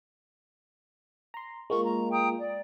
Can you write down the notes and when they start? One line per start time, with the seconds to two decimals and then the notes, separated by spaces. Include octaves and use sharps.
1.34 A#5 C6
1.70 G#3 A#3 F4 C#6
1.86 A#5
2.11 G5 A#5 D#6
2.39 D5